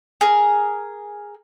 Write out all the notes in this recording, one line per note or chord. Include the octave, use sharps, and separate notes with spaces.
G#4 A#4